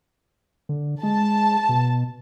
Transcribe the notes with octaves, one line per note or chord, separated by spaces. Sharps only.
D3
G#3 A5
B2